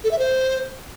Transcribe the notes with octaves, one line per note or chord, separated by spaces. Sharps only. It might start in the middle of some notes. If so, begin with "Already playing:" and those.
A4
E5
C5